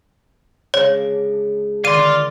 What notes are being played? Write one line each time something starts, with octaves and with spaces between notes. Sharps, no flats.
C#3 G#3 D4 C#5
D3 D#3 D5 F5 C6 D#7